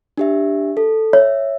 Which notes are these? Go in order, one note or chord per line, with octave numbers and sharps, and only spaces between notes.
D4 G4 E5
A4
C#5 E5